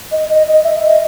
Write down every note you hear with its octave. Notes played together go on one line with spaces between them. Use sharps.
D#5
D#5
D#5
E5
D#5